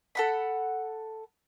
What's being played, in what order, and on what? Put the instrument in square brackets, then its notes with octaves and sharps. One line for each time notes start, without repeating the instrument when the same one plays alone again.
[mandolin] A4 F#5 B5